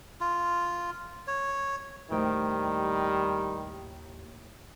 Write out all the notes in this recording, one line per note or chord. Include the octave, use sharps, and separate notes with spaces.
F4
C#5
D#2 A2 D#3 G3 C5 G5